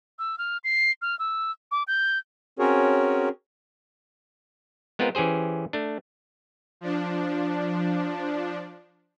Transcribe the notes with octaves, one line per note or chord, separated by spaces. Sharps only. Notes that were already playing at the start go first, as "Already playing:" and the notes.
E6
F6
C7
F6
E6
D6
G6
C4 C#4 F#4 G#4 A#4 C#5
G#3 B3 C4 F4 A#4
E3 C#4 G4 G#4 C5
A3 D4
F3 D4